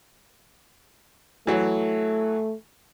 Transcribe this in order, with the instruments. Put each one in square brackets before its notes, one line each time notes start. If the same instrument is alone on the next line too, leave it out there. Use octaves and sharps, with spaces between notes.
[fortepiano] E3 F#3 [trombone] A3